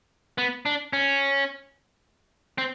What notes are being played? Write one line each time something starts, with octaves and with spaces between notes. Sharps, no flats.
B3
D4
C#4
C4